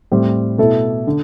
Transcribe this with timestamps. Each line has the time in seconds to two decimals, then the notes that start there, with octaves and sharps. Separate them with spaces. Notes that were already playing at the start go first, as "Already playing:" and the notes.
0.12 A2 G3 C4
0.58 B2 A3 E4 A4
1.07 D3